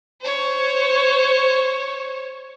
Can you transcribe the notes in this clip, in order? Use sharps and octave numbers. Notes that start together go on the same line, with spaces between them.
C5 C#5